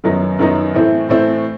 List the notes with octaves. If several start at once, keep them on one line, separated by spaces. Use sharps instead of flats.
F#2 D#3 F#3 B3 D#4
F#2 D#3 F#3 B3 D#4
A2 E3 A3 C4 E4
A2 E3 A3 C4 E4